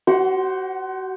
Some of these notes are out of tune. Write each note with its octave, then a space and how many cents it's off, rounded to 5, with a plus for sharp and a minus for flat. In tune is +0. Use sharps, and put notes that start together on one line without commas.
F#4 +35 C5 +0 F#5 +0